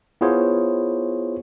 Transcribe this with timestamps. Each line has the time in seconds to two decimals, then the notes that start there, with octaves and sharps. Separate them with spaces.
0.21 B3 E4 F4 G#4 C5 C#5